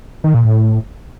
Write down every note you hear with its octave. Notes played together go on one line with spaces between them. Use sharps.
D#3
A#2
A2